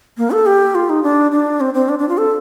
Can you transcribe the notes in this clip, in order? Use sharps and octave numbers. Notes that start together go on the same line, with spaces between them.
A#3
A4
G4
F4
D#4
D4
D4
C4
C4
D4
D4
F4
A4